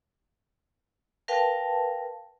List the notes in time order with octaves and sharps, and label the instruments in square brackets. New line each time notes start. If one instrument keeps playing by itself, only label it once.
[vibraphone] A#4 B4 F5 G5 A5